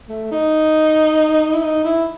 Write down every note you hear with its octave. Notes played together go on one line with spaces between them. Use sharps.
A3
D#4
E4
D#4
E4